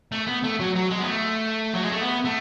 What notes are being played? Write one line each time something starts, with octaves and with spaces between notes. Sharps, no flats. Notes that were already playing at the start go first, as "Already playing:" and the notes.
A3
B3
A3
F#3
F#3
G#3
B3
A3
F#3
G#3
A3
B3
A3